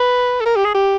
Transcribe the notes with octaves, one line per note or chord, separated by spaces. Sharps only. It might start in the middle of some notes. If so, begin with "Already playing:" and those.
Already playing: B4
A4
A#4
G4
G#4
G4